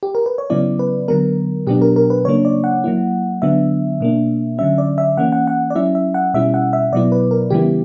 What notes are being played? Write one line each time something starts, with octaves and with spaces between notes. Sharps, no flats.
G4
A#4
B4
C#5
C#3 F#3 B3 E4 D5
B4
D3 F#3 B3 A#4
B2 F#3 B3 D4 G4
A#4
A#4
B4
C#3 F#3 A#3 D4 C#5
D5
F#5
F#3 A#3 E4
D3 F#3 B3 D4 E5
B2 A#3 D4
D3 F#3 C#4 E5
D5
E5
E3 A#3 C#4 F#5
F#5
F#5
D5
F#3 C#4 E4 E5
E5
F#5
B2 G3 C#4 E4 E5
F#5
E5
B2 F#3 B3 E4 D5
B4
A#4
C#3 E3 G3 B3 E4 G4